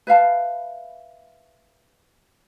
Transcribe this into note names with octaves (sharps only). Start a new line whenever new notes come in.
B4 E5 F5 A5